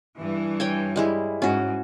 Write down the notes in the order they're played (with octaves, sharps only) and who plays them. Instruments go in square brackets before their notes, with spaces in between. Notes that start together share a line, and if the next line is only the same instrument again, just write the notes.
[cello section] G2 E3
[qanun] C#5 G5 G#5
G3 G#3 E4
[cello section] G#2 [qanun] C#4 F#4